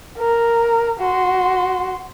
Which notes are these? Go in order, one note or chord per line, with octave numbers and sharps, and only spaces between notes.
A#4
F#4 C6